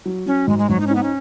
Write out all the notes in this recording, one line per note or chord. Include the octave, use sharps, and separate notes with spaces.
F#3
F#3 C#4
G#2 G#3
G#3
G#2 F#3
D#4
C#4
B3 D#4
C#4